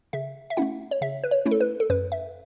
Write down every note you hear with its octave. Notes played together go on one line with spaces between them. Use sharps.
C#3 E5
E5
A3 C#4 E4 F#5
C#5
C#3 E5
B4
C#5
A3 C#4 E4
A4
B4
A4
F#2 B4
E5